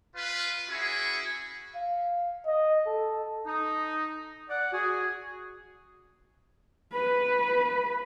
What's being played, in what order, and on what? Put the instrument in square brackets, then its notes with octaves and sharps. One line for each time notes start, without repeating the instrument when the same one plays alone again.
[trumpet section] F4 B4
C#4 E4 F#4 G#4
[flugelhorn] F5
D#5
A4
[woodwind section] D#4
D5 F#5
F#4 G#4
[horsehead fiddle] B4